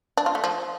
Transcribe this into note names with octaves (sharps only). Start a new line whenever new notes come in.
D4
F4
A3
F3